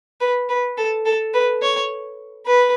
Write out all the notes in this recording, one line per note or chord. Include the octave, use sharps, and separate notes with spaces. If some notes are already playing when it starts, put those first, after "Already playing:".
B4
B4
A4
A4
B4
C#5
B4